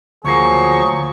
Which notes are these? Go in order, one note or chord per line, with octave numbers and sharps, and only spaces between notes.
D2 F3 F#3 A#3 G#4 C#6